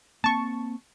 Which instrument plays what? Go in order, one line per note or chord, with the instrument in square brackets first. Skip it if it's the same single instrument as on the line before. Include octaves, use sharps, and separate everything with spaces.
[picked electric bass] A#3 C4 [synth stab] A5 C#6